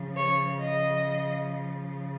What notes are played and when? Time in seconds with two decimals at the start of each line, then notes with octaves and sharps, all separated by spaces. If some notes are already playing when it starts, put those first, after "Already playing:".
Already playing: C#3 F3
0.16 C#5
0.61 D#5